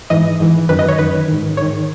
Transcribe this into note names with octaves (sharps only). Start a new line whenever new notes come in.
G#2 E3 D#5
G#2 E3
F#2 D#3 B4
D#5
C#5
F#2 D#3 B4
G#2 D#3
G#2 D#3 C#5